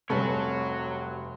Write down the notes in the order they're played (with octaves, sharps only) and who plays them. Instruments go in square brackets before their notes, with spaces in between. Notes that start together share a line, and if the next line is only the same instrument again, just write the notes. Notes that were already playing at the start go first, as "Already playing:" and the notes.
[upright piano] F1 C3 B4 [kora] G3 C#4 A4 [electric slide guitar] F#4 C#5